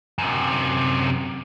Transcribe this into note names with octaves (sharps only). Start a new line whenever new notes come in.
F#2 C3